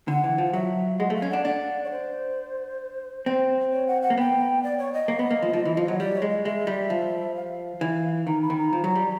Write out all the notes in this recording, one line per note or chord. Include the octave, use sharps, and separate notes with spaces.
D3 F#5
E3
F3
F#3 E5
G#3 F#5
A3 F5
C#4
D4 F#5
D4 F#5
C#5
C5
C4
C#5
F#5
F#5
A#3
B3 G5
D5
C#5
D#5
A#3
B3
A#3
F3
F3
E3
F3
F#3
G3 D5
C#5
G#3
D#5
G#3 E5
G3
F3
F5
E3
D#3 A#5
B5
D#3
A#5
F3
F#3
G3